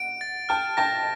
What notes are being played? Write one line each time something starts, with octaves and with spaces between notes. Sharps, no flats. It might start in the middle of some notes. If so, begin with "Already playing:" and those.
Already playing: F#5 D7
A6
G5 A5 F6
G5 A5 A#6